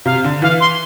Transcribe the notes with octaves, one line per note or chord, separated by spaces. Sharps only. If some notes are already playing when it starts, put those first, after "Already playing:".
C3 F5
D3
E3 F5
C6